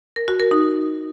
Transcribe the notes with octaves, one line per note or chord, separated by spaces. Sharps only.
A#4
F#4
A#4
D#4